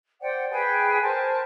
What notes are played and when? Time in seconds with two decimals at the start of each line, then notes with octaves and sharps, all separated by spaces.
0.21 C5 D5 F#5 G5
0.50 G#4 B4 G5 G#5
1.02 A#4 C5 G#5 A5